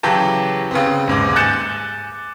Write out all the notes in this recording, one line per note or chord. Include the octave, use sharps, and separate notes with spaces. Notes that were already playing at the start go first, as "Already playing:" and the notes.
C#3 E3 F#3 G4 A5
C#3 B3 C4
D#1 G#2 D6
G#5 F#6 G6 A6 C#7 E7